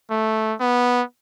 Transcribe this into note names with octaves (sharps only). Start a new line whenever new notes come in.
A3
B3